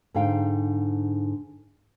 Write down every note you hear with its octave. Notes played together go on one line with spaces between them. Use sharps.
G#2 D3 D#4 F5 G5